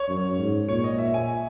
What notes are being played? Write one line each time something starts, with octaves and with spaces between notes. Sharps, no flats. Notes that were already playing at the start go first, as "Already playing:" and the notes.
Already playing: C#5
F#2
G#2
A#2 C#5
D#5
E5
G#5